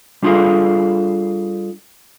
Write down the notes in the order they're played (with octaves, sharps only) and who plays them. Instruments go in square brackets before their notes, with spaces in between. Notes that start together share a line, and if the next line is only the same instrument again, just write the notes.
[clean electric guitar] G3 D4 F4 G#4 A4 F5